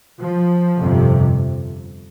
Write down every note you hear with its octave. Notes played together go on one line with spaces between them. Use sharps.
F3
G1 F2 C3